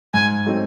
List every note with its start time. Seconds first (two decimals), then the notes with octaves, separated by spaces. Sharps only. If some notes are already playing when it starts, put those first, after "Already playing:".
0.14 G#2 G#5
0.46 F#3 A3 C4 D#4